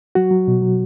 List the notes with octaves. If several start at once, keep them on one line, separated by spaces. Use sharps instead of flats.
F#3 F#4
F#3
B2
F#3